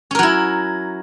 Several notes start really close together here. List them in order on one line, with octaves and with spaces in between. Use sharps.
C#4 A#4 F#3 E4